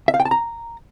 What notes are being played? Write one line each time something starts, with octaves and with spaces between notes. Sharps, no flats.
E5
F5
G5
A5
A#5